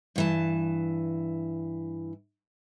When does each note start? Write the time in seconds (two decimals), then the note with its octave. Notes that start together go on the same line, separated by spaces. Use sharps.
0.16 G2 E3 A5